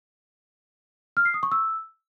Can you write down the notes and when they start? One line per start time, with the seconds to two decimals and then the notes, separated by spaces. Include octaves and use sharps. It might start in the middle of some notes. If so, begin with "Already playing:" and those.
1.17 F6
1.25 C7
1.34 D#6
1.43 C#6
1.52 E6